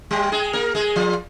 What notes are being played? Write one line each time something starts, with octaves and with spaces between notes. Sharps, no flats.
G3 G4
G#3 G#4
A#3 A#4
G#3 G#4
F3 F4